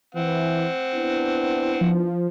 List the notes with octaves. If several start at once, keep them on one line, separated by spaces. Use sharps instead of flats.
E3 C4 F#5
B3 D4 E4
F3